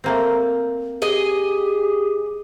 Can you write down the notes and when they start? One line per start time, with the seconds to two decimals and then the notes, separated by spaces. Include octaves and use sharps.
0.04 A3 A#3 C4
1.02 G4 G#4 D#5